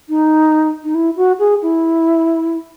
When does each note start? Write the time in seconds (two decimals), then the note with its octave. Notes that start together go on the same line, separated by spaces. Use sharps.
0.09 D#4
0.84 D#4
0.95 E4
1.17 F#4
1.39 G#4
1.62 E4